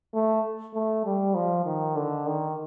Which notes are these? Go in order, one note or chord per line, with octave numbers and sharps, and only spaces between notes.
A3
A3
G3
F3
D#3
D3
D#3